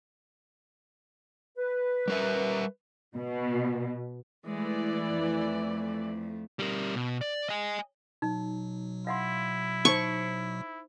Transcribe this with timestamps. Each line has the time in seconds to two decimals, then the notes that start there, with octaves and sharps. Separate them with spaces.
1.57 B4
2.08 G3 A#4 E5
3.15 B2
4.46 E3 G#3 A3 D5
5.14 F2 A3
6.59 G3 A#4
6.95 B2
7.21 D5
7.49 D#5 G#5
8.22 B2 F#3 D#4
9.07 E4 F5 F#5 C6
9.85 D#4 C5 C#6